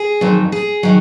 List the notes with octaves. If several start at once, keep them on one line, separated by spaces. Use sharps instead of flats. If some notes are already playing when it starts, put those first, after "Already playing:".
Already playing: G#4
F2 D#3 F#3
G#4
D#3 F#3